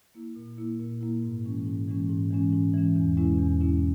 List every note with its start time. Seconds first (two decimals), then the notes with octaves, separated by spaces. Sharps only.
0.15 A#3 E4
0.36 A#2
0.58 A#3 E4
0.79 A#2
1.01 A#3 E4
1.23 G#2
1.45 E3 G#3 C#4
1.66 G#2
1.88 E3 G#3 C#4
2.09 G#2
2.31 E3 G#3 C#4
2.53 G#2
2.74 E3 G#3 C#4
2.96 E2
3.17 B2 G#3 C#4 E4
3.39 E2
3.60 B2 G#3 C#4 E4